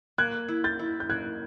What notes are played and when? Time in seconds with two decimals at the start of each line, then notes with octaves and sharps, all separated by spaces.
0.18 A#3 F#6 G#6
0.49 E4
0.64 G6 A6
0.79 E4
1.00 G6
1.09 A#3 F#6 G#6